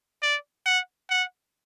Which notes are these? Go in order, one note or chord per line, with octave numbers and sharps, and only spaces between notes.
D5
F#5
F#5